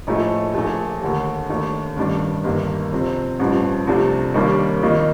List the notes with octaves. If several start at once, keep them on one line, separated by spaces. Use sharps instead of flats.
A#1 A2 F3 A3 D#4
A#1 A#2 F3 A3
D#2 D3 A3
D#2 D#3 A3 D4
A1 G2 D#3 G3 D4
G1 G2 D#3 A#3
F2 C3 F3 C4
A1 G2 F3
C2 C3 F3 A3 D4
D#2 D#3 G3 A#3 D4
F2 D#3 A#3 D#4